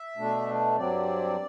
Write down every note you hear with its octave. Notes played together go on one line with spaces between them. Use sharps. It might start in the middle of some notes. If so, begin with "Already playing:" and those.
Already playing: E5
B2 A3 D4
G2 F#3 C4 D5